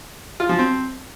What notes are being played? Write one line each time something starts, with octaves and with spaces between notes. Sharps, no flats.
F4
F3
C4